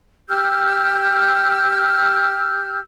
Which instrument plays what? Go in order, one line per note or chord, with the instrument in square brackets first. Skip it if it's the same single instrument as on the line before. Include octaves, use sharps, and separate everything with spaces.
[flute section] G4 E6 F6 G6